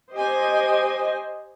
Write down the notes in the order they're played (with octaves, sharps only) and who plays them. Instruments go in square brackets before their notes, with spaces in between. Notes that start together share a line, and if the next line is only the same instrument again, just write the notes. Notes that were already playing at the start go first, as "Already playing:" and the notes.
[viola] G4 G#5 [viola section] C5 D#5